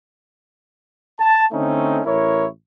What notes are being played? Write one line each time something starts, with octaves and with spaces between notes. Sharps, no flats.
A5
D3 A3 C4 C#4 D#4
A1 E4 A#4 C#5